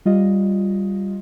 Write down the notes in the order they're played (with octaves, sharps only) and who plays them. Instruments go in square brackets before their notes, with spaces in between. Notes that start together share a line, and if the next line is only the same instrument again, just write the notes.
[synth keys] G3 F4 D#5